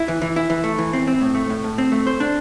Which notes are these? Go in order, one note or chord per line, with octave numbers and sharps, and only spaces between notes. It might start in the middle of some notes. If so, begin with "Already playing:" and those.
Already playing: E4
E3
E3
E4
E3
A3
E3
C4
C4
A2
A3
A2
A2
C4
A3
C5
D4